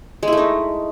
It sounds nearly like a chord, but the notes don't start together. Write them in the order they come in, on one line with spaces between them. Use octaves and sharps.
G#3 E4 A3 D#4